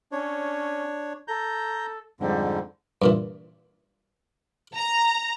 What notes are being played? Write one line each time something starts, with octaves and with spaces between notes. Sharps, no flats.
C#4 D4 C#5
A4 A#5 G6
F2 G#2 D3 G3
G2 A#2 E3
A#5